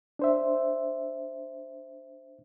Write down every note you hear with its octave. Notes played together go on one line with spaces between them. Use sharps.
D4 C5 E5